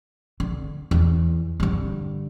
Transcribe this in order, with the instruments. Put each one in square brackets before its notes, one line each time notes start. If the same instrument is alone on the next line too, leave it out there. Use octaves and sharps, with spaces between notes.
[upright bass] D3
E2
G2 D3